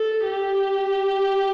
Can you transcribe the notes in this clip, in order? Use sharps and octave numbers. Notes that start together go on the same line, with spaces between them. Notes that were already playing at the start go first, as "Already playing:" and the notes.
Already playing: A4
G4